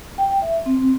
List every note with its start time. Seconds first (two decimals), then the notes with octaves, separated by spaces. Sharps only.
0.18 G5
0.42 E5
0.66 C4